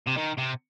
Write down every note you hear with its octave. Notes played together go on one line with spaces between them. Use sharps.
C3
D#3
C3